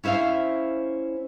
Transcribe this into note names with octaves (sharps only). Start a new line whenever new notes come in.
C#4 E4 C5 E5 F5